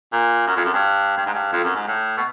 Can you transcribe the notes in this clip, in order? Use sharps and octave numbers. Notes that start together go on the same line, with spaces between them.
A#2
F#2
F2
F#2
G2
G2
G#2
G2
F2
F#2
G#2
A2
B2